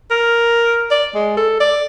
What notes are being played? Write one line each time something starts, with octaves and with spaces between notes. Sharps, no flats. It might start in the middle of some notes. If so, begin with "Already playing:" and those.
A#4
D5
G#3
A4
D5